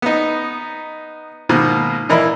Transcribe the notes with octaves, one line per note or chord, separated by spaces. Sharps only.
B3 D#4
G#2 B2 D#3 A#3
A#2 E3 A#4 D#5 B5